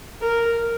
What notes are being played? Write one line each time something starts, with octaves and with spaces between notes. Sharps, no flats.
A#4